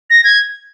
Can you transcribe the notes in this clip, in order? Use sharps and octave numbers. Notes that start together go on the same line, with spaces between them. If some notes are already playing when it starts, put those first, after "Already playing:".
A#6
G#6